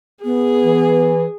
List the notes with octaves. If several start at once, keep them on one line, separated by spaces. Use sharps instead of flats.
B3 G#4
E3